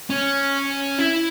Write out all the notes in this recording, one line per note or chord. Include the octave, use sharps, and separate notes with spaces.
C#4
E4